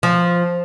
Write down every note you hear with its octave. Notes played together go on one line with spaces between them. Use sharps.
F3